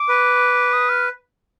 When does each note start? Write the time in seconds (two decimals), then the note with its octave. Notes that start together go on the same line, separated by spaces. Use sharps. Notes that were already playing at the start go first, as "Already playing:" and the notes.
Already playing: D6
0.09 B4
0.73 D#6
0.89 F6